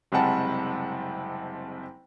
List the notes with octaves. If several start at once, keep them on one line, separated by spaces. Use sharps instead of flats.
F#1 C3 G3 G#3 F#5 A5